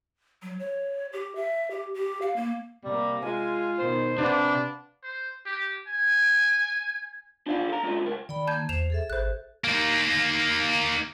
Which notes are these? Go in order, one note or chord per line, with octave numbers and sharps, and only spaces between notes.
F#3
C#5
G4
E5
G4
G4
F5
A#3
C3 G3 A#3
G#3 F4 G#5
B2 D#3 C5
C3 D4 B4 F5 F#5
C5
G4
G#5
D4 F4 D5 F5
A4 A#5
G#3 C#4 D4 F4 A4
C#2 A#4
D#3 D5 G5 B5
A#3 A5 G6 G#6
E2 C5 E7 F7
G#4 A4 E5
G#1 C5 F#6
A#3 D#4